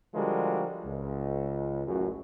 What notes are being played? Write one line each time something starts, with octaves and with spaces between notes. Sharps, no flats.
D3 F3 G3 G#3 F#4 A#4
C#2
A1 F#2 F#3